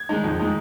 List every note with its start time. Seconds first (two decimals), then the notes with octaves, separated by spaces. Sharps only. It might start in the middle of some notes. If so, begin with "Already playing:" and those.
Already playing: G#6
0.09 D#3 G#3 D#4
0.24 F2
0.40 D#3 G#3 D#4